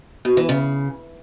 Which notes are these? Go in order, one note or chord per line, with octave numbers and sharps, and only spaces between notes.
B2
E3
C#3